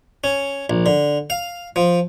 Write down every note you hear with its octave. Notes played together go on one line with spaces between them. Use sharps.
C#4
A#1
D3
F5
F3